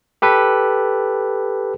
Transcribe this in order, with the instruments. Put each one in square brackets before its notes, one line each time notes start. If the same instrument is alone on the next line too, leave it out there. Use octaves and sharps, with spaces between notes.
[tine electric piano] G4 A4 B4